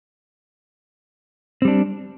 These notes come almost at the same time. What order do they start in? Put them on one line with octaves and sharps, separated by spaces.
C4 G3 D4